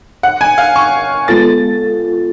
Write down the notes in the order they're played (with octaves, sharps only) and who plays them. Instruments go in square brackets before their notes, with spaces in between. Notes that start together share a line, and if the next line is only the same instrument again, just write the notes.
[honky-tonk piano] F#5
G#5
F5
C#6
[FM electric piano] G#3 B3 F4 A4 [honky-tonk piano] A6